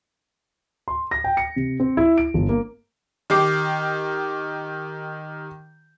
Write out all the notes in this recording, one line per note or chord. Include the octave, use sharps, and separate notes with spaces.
C6
A#6
G5
C#7
C3
C4
E4
D7
G1
A#3
D#3 G4 D6 C7